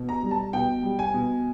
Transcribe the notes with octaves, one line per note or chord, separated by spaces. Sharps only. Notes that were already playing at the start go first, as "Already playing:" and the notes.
Already playing: B2
A#5
G3
A5
B2 G5
G3
G#5
B2